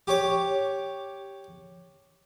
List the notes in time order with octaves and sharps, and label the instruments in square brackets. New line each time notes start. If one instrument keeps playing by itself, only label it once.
[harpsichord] G4 C#5 D6